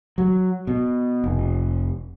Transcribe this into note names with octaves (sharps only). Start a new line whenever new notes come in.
F#3
B2
F1